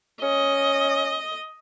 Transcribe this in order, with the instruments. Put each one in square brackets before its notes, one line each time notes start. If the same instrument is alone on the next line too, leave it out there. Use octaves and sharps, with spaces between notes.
[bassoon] C#4 [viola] D#5